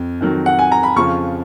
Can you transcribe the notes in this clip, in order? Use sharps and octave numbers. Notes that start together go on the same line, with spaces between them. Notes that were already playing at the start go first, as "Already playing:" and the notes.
Already playing: F2
F2 D#3 F#3
F#5
G#5
A#5
B5
F2 C#3 F3 C#6